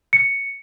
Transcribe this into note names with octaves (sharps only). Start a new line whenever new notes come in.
C#7